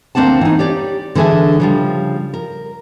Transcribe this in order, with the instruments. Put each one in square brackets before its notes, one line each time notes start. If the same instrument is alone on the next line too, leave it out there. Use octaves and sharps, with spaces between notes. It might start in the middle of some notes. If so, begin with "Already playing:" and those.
[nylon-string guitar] D2 A#3 C4 D4 F#5 A5
E3 D#4
G4 C#5 D5
D3 E3 D4 G#4 E5 G#5
C#3 F3 G3
A#4